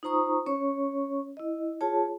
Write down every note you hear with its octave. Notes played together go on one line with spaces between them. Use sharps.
D#4 F4 C5 A#5 C#6 D#6
C#4 C#5 C#6
E4 D#5
F4 G#4 C#5 A5